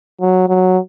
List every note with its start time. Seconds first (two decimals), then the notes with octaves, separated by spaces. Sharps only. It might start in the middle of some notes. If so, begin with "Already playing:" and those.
0.21 F#3
0.49 F#3